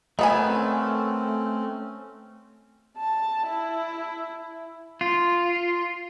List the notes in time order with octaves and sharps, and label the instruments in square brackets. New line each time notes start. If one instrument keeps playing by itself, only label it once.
[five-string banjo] D#3 B3 G#5 [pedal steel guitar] A3
[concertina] C4 C#4
[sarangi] A5
E4
[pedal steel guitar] F4